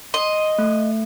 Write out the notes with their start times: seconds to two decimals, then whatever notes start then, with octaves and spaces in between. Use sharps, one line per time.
0.14 D#5 C6
0.58 A3